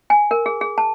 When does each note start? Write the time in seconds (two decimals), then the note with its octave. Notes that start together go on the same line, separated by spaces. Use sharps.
0.10 G#5
0.31 A#4
0.46 G#4
0.61 G#4
0.78 A5